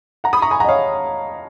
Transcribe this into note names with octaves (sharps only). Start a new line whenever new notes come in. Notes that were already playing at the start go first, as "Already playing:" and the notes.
F#5 A#5
B5 D#6
A#5 C#6
G#5 B5
F#5 A#5
D#5
C#5 F5